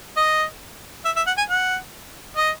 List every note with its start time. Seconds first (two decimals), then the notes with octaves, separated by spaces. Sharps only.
0.17 D#5
1.05 E5
1.17 E5
1.27 F#5
1.38 G#5
1.49 F#5
2.37 D#5